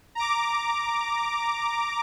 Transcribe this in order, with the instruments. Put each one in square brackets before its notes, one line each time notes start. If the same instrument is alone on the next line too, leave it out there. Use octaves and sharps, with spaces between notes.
[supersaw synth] A#5 D6